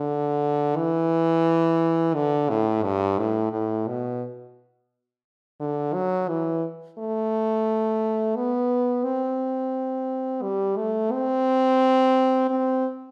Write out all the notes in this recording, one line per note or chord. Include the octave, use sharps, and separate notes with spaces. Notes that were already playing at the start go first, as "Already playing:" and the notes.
Already playing: D3
E3
D3
A2
G2
A2
A2
B2
D3
F#3
E3
A3
B3
C4
G3
A3
C4
C4